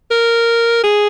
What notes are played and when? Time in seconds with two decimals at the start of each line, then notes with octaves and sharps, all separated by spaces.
0.11 A#4
0.83 G#4